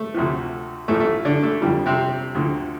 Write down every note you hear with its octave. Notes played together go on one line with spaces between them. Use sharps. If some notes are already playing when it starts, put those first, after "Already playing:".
Already playing: A3
D2 C3 F3
A1 A2 F3 A3
A3
D3 D4
A3
F2 D3 F3 G3
C3 C4
D2 D3 F3